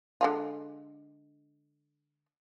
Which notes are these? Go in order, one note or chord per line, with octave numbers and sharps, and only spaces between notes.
D3 G#3 F4